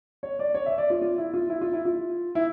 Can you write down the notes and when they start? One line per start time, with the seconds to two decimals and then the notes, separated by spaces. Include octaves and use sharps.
0.23 C#5
0.39 D5
0.54 C#5
0.66 E5
0.78 D5
0.90 F4
1.01 F4
1.18 E4
1.34 F4
1.50 E4
1.61 F4
1.73 E4
1.85 F4
2.35 E4